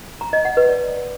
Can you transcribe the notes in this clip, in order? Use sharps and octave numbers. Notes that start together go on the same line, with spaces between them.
A#5
D#5
F#5
B4
D5